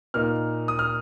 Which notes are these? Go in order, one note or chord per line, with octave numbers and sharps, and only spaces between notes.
A#2 A#3 D#4 F6
D#6
F6